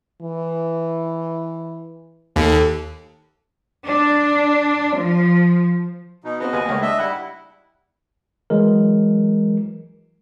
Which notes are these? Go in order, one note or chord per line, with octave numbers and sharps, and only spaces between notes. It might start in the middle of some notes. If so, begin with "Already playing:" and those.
E3
D#2 A4
D4
F3
B2 D#4
B3 C4 F#4 D#5
D#2 B4 G#5
C#2 A#3 C#5
D4 D#5 E5
G3 E4 F#5 F#6
E3 F#3 G#3 A#4